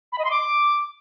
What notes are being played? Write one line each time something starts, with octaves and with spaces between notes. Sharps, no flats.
B5
D#5
C6
D6